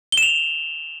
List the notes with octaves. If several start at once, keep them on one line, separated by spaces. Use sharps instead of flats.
G7
E7
F7